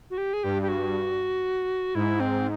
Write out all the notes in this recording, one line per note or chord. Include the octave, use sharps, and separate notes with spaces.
F#4
G4
G#4
G2 G4
G4
F#4
G#2 E4
C4